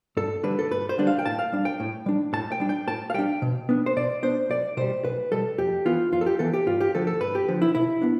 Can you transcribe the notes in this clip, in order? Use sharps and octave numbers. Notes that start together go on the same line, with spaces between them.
G2 A4
D3 G3 D4 B4
A4
G2 B4
C5
D3 G3 D4
F5
G5
A2 A5
F5
G3 D4
G5
A2
G3 D4
A2 A5
G5
G3 D4
G5
A2 A5
F5
G3 D4 G5
B2
B3 D4
C5
B2 D5
B3 D4 C5
B1 D5
B2 G3 C5
B1 B4
B2 G3 A4
F2 G4
E3 B3 F4
F2 F4
A4
G4
E3 B3 A4
G4
G2 F4
G4
D3 F3 A4
A4
G2 B4
G4
D3 F3
E4
B2 E4
B3 D4